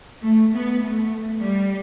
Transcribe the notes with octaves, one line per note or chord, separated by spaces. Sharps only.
A3
B3
A3
G3